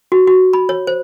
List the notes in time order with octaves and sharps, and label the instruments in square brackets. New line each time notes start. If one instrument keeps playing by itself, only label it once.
[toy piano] F#4
F#4
B5
C#5
C5